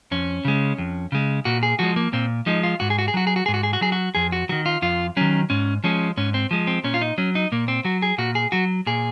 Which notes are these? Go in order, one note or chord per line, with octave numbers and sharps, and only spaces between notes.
F2 C#4
C#3 G#3
F2
C#3 G#3
A#2 F#4
G#4
F3 G#3 F#4
A#3
A#2 C4
F3 G#3 D#4
F4
G#2 F#4
G#4
F#4
G#4
F#3 F#4
G#4
F#4
G#2 G#4
F#4
G#4
F#4
F#3 G#4
F#4
F2 G#4
F#4
D#3 F#3 F#4
F4
F2 F4
D#3 F#3 C#4
G#2 C#4
F3 G#3 C#4
G#2 C#4
C4
F3 G#3
C4
A#2 C#4
F4
D#4
F#3 C#4
D#4
A#2 A#3
C4
F#3 F#4
G#4
A#2 F#4
G#4
F#3 F#4
A#2 G#4